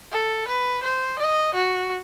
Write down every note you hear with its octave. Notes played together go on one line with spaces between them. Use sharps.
A4
B4
C5
D#5
F#4